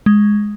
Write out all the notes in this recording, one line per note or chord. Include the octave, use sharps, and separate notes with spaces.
G#3